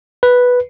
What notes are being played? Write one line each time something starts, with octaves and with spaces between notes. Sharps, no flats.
B4